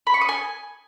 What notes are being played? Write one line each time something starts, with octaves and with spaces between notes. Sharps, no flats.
B5
C#6
D#6
G#5